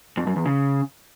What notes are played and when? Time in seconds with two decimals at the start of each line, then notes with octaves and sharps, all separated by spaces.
0.17 F2
0.27 F#2
0.36 E2
0.45 C#3